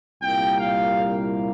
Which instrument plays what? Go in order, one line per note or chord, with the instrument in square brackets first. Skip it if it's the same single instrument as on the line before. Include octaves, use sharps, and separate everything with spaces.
[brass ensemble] C2 A#2 G3 A#3 G5
F5